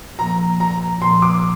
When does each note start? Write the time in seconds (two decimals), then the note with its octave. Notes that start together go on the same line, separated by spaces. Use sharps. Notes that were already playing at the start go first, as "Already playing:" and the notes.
0.18 A#2 F3 A#3 A#5
0.60 A#5
1.02 A#2 F3 A#3 C6
1.22 D6